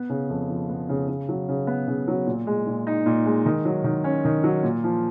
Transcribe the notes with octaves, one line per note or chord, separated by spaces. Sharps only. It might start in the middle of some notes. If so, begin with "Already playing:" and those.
Already playing: B3
C#3
F2
F3
B3
C#3
C#3
F#3
C#3
B3
C#3
F#3
A#2
G#3
A#2
D#4
A#2
G#3
D#3
F#3
D#3
C#4
D#3
F#3
A#2
F3